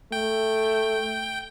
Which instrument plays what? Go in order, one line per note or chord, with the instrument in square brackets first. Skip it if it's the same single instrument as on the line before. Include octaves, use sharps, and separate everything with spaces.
[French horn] A3 [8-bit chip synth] G5